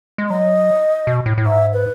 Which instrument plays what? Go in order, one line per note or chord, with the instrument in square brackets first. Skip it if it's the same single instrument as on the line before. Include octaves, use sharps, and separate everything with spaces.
[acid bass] G#3
[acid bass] F#3 [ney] D#5
[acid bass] B2
A2
A2
[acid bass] G#2 [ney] E5
[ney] B4